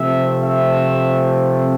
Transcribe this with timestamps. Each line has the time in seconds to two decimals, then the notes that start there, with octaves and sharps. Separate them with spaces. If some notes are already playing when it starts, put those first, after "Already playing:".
Already playing: C3 F3 A3 C4 E5
0.44 E5